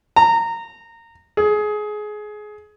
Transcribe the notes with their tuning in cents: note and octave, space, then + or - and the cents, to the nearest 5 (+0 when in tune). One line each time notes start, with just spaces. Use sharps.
A#5 -20
G#4 +20